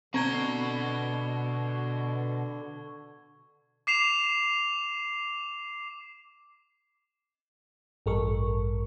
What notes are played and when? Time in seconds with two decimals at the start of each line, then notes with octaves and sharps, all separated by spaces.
0.14 B2 D3 C4 C#6 G#6 G7
3.87 D6 C7 E7 F7
8.06 A1 G2 A4 A#4 C#6